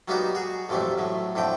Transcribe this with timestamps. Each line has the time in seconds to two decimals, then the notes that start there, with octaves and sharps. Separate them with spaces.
0.08 F#3 G3 A#3 B3 D#4 F#4
0.35 F#4 G#4
0.69 A1 F2 F#3 G3 A3
0.98 A2 F#3
1.35 F2 A2 D3 G5